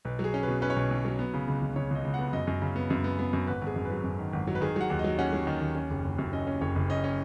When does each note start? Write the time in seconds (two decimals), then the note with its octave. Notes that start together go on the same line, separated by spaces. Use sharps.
0.05 B1 B4
0.19 F#3
0.24 G#4
0.34 C#4
0.43 B4
0.48 B2
0.62 C#4 B4
0.70 C#5
0.76 B1 B4
0.90 B1
1.05 F#3
1.19 B3
1.34 C#3
1.48 C#2
1.62 C#2
1.76 C#3 C#5
1.91 C#2 D#5
2.05 C#2
2.14 B3 F#5
2.33 F#2 D#5
2.47 F#2
2.62 C#3
2.76 B3
2.90 F#2
3.04 B3
3.19 B3
3.33 F#2
3.47 G#1 B4
3.62 G#1 G#4
3.76 F#2
3.85 B4
3.90 F#3
4.04 F#2
4.19 D#3
4.33 G#1
4.48 F#3
4.55 B4
4.61 D#3 G#4
4.76 F#3 F#5
4.90 D#2
4.99 D#5
5.04 F#3
5.19 C#4 F#5
5.33 F#3
5.47 D#3
5.61 D#2
5.75 C#4
5.90 F#1
6.04 F#1
6.19 F#2
6.33 C#4 D#5
6.47 C#4
6.61 F#1 C#5
6.76 F#1
6.90 C#4 D#5
7.04 C#4